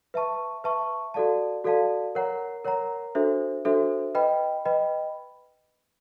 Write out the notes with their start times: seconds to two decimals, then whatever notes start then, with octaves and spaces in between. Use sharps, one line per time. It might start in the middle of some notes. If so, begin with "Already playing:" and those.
0.14 B4 E5 A5 C#6
0.64 B4 E5 A5 C#6
1.14 F#4 A4 D5 F5 A5
1.64 F#4 A4 D5 F5 A5
2.15 A#4 C#5 F#5 A#5
2.65 A#4 C#5 F#5 A#5
3.15 D4 F#4 A4 C5 E5
3.65 D4 F#4 A4 C5 E5
4.15 B4 D#5 G5 B5
4.65 B4 D#5 G5 B5